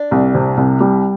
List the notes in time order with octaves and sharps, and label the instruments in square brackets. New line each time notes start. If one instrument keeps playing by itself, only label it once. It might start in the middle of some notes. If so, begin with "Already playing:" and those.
Already playing: [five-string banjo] D4
[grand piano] C2
C3
C2
G3